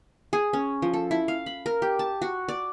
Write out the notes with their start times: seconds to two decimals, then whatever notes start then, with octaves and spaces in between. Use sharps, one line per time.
0.33 G#4
0.53 C#4
0.82 F3
0.94 A4
1.11 E4
1.28 F5
1.46 B5
1.66 A#4
1.82 G4
1.99 A5
2.22 F#4
2.49 D5